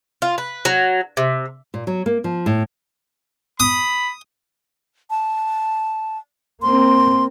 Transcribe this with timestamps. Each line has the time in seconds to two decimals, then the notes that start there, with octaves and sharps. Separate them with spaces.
0.22 F4
0.38 B4
0.65 F#3
1.17 C3
1.74 A#2
1.87 F#3
2.06 A#3
2.24 F3
2.46 A2
3.60 B5 D#6
5.10 A5
6.62 A#3 C4 C6